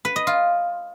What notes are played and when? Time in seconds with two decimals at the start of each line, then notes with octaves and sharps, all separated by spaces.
0.05 B4
0.16 D#5
0.27 F4